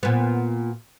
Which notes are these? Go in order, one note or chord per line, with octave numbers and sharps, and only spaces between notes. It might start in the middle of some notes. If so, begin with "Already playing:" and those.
A#2 B3